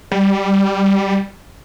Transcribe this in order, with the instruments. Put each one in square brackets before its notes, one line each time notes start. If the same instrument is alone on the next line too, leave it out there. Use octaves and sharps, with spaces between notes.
[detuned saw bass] G3